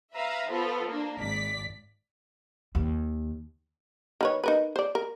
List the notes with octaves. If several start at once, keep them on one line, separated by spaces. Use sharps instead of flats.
B4 E5 F5 A#5
F3 B3 F4 A4
A#3 D4
G#1 D5 B6
D#2
D#3 B4 C#5
D#4 A#4 B4
C5 D5
A#4